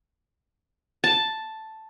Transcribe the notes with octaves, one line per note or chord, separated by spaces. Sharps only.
A5